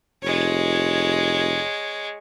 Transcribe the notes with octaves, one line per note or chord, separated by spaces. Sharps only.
F1 G#3 C#5